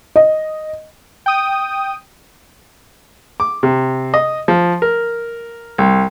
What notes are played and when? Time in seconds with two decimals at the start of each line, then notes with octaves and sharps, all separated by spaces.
0.16 D#5
1.26 G5 D#6
3.40 D6
3.63 C3
4.14 D#5
4.48 F3
4.82 A#4
5.78 C2